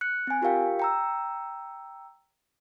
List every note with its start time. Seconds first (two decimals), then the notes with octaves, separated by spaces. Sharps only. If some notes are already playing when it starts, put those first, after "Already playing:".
0.01 F#6 C#7
0.27 C4 G#5
0.42 F4 G4 A#4 F5 G5
0.79 G5 A#5 E6